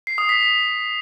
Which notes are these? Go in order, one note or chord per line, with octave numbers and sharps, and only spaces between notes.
C7
D#6
B6